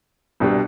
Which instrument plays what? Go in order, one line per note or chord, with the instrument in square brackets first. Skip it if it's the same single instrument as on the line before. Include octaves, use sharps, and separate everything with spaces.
[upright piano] C2 B2 G3 D4